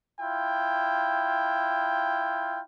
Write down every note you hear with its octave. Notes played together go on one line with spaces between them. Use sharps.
E4 F4 G5